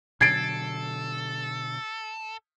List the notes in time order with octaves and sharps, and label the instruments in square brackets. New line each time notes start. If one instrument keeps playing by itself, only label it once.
[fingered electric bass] B2 D3 F#3 [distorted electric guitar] A4 [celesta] G#6 [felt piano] A6 C7 D7